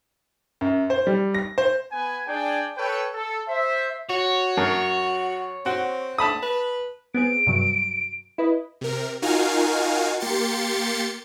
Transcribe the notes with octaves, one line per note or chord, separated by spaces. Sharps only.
F#2
C5
G3
A#6
C5
B3 B4 G#5
D4 G#4 D5 G5 G#5
A4 B4 C#5 G5
A4
C5 E5
F#4 C#5
F#2
C4 F#4
A5 B5 D#6
B4
B3 C4 G#4 D7
G2 C3 F#3
E4 B4 D#5
C3 A#4
D#4 F4 F#4 A#4 F5 G#5
A#3 G4 C6 A6 C#7